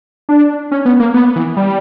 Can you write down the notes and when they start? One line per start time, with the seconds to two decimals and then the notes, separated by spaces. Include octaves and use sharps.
0.29 D4
0.71 C#4
0.85 B3
1.00 A#3
1.14 B3
1.36 E3
1.57 G3